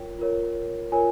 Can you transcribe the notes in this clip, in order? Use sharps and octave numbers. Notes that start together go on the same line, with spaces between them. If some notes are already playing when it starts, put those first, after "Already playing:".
Already playing: F4 A#4 C#5 G5
F4 A#4 C#5
F4 A#4 C#5 G#5